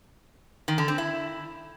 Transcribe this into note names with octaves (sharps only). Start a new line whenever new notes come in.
D#3
D3
C4
E4